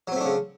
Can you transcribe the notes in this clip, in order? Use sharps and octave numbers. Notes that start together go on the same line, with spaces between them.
C#3 F#3 A3 C4 D4